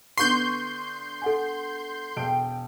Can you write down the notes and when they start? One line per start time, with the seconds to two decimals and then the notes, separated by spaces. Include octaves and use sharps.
0.18 D3 B3 C6 C#6 G6
1.22 A4 F#5 G#5
2.17 E1 G5 D7